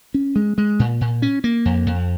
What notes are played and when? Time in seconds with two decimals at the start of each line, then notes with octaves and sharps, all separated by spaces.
0.14 C#4
0.36 G#3
0.58 G#3
0.79 A#2
1.01 A#2
1.22 C#4
1.44 A#3
1.65 F2
1.86 F2